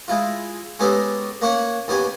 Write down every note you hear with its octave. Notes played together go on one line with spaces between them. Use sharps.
G#3 E4 F4
G#3 B3 C#4 D#4 G4 A4
A#3 C#4 C#5 F#5
D#2 B3 C#4 G4 G#5